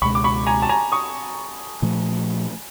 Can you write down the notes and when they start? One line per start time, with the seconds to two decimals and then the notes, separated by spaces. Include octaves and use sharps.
0.02 C#2 B2 G#3 B5 C#6
0.15 D6
0.24 B5 C#6
0.47 G#5 A#5
0.62 A5
0.69 G#5 A#5
0.92 C#6 D#6
1.82 A#2 F3 A3